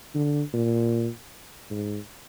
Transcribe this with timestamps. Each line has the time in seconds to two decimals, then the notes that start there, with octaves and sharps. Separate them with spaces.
0.15 D3
0.54 A#2
1.70 G#2